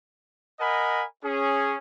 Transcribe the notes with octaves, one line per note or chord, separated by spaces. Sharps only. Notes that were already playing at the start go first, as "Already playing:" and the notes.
A#4 D#5 F#5 G#5 B5
C#4 G#4